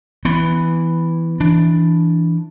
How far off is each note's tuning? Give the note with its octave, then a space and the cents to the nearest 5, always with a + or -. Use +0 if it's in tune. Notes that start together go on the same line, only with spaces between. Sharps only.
E3 +0 B3 +15
E3 +0 D4 +0